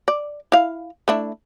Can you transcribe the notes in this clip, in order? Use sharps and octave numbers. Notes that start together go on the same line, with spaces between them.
D5
E4 F5
A3 D4 E4